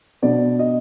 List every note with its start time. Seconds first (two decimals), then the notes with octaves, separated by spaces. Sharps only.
0.22 B2 B3 D4 D5
0.59 D#5